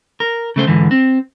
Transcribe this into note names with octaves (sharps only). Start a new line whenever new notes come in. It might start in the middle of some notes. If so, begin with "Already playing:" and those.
A#4
C#3 A3 C5
G#2 D3 E3
C4